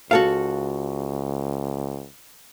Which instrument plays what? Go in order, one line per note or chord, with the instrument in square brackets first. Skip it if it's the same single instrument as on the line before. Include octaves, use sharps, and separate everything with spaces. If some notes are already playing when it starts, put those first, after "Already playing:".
[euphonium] C#2 [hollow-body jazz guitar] F#4 A4 F5